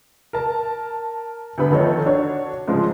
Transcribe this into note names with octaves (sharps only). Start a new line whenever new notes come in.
A#4 A5
D2 G2 B3 B5
D#3 F3 A4 C#5 D#5
D4 F#4 C#5
G#2 C#3 F3 G#3